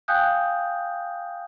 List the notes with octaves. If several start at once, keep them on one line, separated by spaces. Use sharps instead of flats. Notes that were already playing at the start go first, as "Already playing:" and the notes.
F5 G5 G#5 D#6 F#6 G6